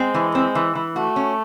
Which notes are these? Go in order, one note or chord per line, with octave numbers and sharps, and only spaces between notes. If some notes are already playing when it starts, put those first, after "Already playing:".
Already playing: G#3 C4
E3
C4
E3
E3
A3 F#4
C#4